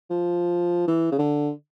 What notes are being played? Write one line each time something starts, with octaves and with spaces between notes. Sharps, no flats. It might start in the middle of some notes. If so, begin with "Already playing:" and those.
F3
E3
C#3
D3